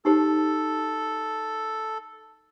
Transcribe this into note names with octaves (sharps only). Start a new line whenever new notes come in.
D#4 G4 A4 C5